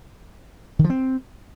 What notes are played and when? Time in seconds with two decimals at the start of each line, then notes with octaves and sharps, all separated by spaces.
0.79 D#3
0.84 F3
0.90 C4